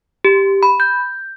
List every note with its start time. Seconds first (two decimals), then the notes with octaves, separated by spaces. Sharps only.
0.25 G4
0.63 B5
0.80 G6